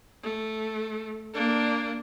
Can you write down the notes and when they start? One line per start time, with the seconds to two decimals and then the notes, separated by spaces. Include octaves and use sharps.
0.23 A3
1.33 A#3 D4